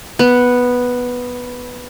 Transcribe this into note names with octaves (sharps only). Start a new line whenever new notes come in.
B3